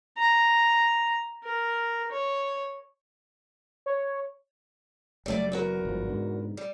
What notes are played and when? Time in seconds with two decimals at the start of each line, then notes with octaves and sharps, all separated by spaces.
0.17 A#5
1.44 A#4
2.12 C#5
3.86 C#5
5.26 F#1 F#2 G3 A3 D5
5.52 E2 F#4 A#4
5.85 G1 G#2 F3
6.07 G#2 B2 D3
6.57 G3